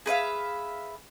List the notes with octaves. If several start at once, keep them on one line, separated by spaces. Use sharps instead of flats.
G#4 B4 E5 F5